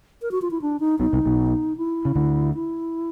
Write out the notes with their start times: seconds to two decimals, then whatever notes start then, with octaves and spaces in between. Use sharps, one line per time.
0.22 A#4
0.31 F#4
0.42 F4
0.51 E4
0.62 D4
0.80 D#4
0.99 B1 B2 D#4
1.13 C2 C3
1.26 B1 B2
1.77 E4
2.05 C#3
2.15 D2 D3
2.54 E4